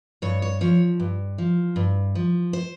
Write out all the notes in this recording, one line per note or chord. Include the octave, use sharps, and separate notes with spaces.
G2 C#5
C#5
F3 C#5
G2
F3
G2
F3
C5